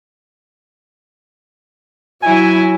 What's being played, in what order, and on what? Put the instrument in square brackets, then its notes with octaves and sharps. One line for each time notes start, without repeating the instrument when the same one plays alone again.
[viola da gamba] F#3 E4 [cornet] G#5